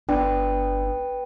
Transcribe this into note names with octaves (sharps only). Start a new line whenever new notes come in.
G1 B3 D4 G5